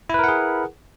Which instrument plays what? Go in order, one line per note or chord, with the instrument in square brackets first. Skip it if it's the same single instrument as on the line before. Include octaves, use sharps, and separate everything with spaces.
[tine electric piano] E4
B4
A#4
F#5
G#4